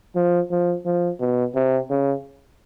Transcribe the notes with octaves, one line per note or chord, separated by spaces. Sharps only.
F3
F3
F3
B2
C3
C#3